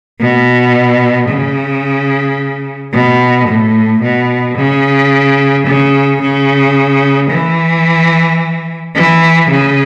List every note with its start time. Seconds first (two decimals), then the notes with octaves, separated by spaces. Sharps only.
0.20 B2
1.29 C#3
2.92 B2
3.48 A2
4.02 B2
4.58 C#3
5.67 C#3
6.21 C#3
7.30 E3
8.95 E3
9.50 C#3